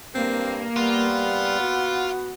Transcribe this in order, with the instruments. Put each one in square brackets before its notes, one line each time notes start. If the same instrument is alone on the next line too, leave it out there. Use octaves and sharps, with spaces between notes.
[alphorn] G2 [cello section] A#3 [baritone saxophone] C4
[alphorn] G3 [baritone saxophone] B3 [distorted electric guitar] F4
[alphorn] F#4